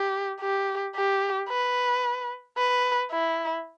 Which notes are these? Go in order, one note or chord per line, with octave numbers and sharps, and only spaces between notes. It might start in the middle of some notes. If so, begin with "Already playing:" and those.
Already playing: G4
G4
G4
B4
B4
E4